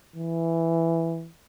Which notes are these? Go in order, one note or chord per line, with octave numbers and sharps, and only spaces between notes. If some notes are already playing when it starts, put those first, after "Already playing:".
E3